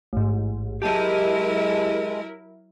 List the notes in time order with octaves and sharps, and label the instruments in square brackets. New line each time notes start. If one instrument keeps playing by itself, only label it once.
[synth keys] A1 G#2
[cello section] F#3 E4 A#4 [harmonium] G#3 [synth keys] G4 A5 D#7